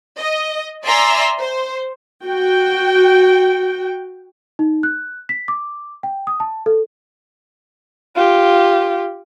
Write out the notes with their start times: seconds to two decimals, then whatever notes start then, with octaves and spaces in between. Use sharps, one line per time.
0.19 D#5
0.83 D5 E5 G#5 A#5 C6 E6
1.39 C5
2.25 F#4 G5
4.59 D#4
4.83 F#6
5.29 B6
5.48 D6
6.03 G5
6.27 D#6
6.40 A5
6.66 A4
8.16 F4 G4